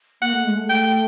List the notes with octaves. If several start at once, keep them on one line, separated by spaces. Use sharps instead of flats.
A#3 F#5
A3
G#3
A3
G5